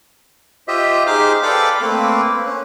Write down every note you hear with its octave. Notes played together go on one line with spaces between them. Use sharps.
F4 G4 C5 D#5 E5
D#4 G4 G#4 C5 D6 F6
A4 B4 D5 F5 G5 D6
A3 A#3 C4 B4
C#4